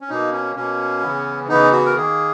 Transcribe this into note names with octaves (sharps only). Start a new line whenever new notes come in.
C#4
B2 A#3 D#4
C#4
B2 A#3 C#4
C#3 E3 B3
C#3 E3 B3 D#4
F#4
A#4
D#3 A#3 G#4